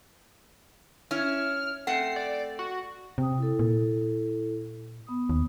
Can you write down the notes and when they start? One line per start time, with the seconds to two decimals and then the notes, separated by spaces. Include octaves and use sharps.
1.11 C#4 E4 F6
1.87 A3 C4 F#5 C7
2.16 D5
2.59 F#4
3.18 C3 G5 D#6
3.38 E4 A4
3.59 A#2
5.07 B3 D#6
5.30 D#2